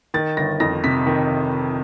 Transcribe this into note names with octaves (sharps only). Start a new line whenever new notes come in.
D#3 A6
G1 A#6
F2 A#6
C3 B6
D#3